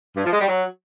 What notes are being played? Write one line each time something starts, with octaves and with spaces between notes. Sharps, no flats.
G2
F3
G#3
G3
F#3